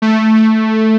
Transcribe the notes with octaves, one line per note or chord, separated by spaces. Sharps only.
A3